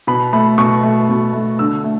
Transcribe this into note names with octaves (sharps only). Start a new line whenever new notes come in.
B2 B5
A3 B5
B2 C#6
A3
B2
A3
D3 E6
A3